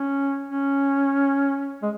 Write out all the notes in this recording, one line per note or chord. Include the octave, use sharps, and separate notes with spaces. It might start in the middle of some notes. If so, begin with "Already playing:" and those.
Already playing: C#4
C#4
G#3